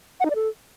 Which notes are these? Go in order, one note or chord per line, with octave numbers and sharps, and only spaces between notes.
F#5
D#4
D5
A4